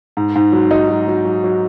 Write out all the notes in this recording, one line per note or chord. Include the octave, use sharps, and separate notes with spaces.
G#2
G#2
F#3
F#3 D#4
F#3
F#3
F#3
F#3